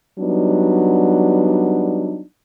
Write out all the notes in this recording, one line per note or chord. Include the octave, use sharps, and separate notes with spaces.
F#3 G3 B3 D4 D#4